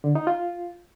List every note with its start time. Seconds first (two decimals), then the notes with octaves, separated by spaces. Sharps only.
0.04 D3
0.15 D#4
0.27 F4